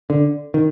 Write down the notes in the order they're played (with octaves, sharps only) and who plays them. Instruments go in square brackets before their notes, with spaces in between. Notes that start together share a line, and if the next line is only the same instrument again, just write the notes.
[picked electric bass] D3
D#3